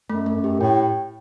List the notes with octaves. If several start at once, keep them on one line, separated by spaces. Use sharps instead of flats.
F#2 A3
A3
F#2
G4
A2 G5